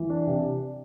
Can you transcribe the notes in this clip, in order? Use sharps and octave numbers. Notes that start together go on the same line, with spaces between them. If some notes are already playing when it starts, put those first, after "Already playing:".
Already playing: E3
D4
C3